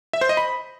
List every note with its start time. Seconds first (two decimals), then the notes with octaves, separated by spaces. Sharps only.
0.13 E5
0.21 C5
0.29 D#5
0.37 B5